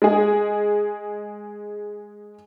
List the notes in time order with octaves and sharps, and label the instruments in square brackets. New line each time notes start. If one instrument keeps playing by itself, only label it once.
[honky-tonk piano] G#3 G#4